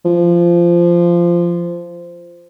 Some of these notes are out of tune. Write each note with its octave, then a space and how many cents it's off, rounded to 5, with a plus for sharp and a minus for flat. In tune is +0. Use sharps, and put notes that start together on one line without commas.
F3 -15